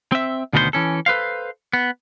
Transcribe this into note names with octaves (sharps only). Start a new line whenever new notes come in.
C4 E5
D2 B2 D#3 B3 F#4 C5
E3 C#4 A4
A4 B4 C5 F5
B3